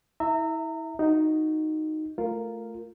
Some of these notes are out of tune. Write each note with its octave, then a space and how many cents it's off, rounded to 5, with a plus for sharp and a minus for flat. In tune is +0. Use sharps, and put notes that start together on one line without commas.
E4 -35 E5 +0 A#5 -30
D#4 +0 F#4 +0
A3 +0 F4 +0 A#4 -5